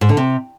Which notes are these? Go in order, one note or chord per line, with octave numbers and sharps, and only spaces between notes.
G#2
D3
C3